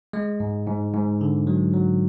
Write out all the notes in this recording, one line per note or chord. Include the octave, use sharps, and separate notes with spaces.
G#3
G#2
G#2
G#2
D3
F#3
F#3